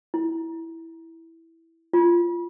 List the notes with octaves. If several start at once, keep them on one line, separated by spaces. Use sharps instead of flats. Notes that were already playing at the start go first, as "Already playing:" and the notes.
E4
F4